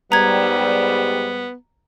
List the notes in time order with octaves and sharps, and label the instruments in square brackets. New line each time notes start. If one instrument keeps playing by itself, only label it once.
[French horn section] G#2 G3 [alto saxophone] B3 [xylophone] A#5 G#6